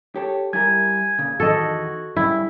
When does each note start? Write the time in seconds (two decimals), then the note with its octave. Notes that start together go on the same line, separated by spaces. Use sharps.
0.16 G4 A4 C#5
0.53 G3 E4 A#4 G#5 G#6
1.19 A#2 C#3
1.40 E2 D#3 F#4 A4 D#5
2.17 G2 C#3 E4